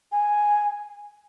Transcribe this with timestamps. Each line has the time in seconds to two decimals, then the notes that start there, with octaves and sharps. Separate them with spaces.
0.12 G#5